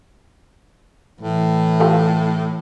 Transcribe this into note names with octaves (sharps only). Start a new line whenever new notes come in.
A2 E3
F4 G4 A4